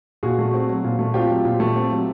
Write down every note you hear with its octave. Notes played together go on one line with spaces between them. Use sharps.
A#2 F#4 G#4
A3
C4
F#3
A#2
A3
C4 F4 G4
F#3
A#2
A3
C4
F#3